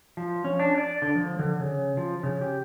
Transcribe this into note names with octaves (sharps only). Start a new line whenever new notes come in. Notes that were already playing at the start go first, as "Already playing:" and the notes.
F3
C#4
D4
D5
D3
F3
D3
C#3
F3
C#3
G4